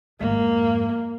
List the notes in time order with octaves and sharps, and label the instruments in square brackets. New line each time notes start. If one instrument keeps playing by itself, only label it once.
[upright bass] F2 G#2 [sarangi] A#3